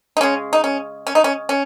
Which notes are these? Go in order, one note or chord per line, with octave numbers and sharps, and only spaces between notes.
D#4
C#3 G#3 C#4
D#4
C#4
C#4
D#4
C#4
C#4